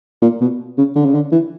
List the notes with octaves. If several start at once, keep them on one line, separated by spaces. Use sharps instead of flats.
A#2
B2
C#3
D3
C#3
D3
E3